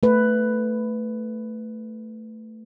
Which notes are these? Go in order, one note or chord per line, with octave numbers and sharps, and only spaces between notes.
A3 B4